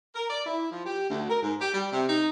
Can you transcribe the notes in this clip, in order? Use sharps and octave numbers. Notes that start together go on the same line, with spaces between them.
A#4
D5
E4
F3
G4
D2
A#4
G#2
G4
G3
C3
D#4